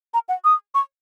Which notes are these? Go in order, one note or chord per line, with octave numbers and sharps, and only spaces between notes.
A#5
F#5
D#6
C#6